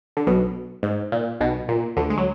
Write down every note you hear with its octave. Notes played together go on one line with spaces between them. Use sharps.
D3
B1 B2
G#2
A#2
B1 B2
A#2
D2 D3
G#3
F#3